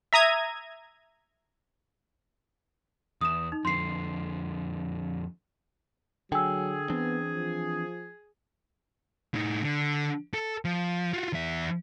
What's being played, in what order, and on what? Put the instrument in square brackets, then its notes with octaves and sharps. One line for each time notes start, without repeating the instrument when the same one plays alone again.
[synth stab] E5 A#5 D#6 G#6
[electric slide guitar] E2 [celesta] D#6 E7
[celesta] D#4
[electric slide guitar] F2 D3 [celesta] C6 C7
[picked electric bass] D3 [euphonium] F#3 [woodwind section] G#4 [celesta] G5 G#5 E6
[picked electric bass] E3 C4 D4 [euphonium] B3
[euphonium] F3
[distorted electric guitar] A2 D#4
D3
A4
F3
F4 F#4
E2 E5